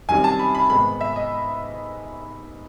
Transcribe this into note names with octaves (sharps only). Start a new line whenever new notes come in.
F#2 D#3 G3 C4 G#5
A5
B5
B5
G#2 D#3 G#3 B3 B5
E5
D#5